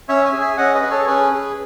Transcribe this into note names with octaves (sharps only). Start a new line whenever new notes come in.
C#4 C#5 E5
E5 G#5
G#4
E5 G#5
C#4 D#5 F#5
B4 D#5
G#4
A4 C#5
C#4 G#4 B4
G#4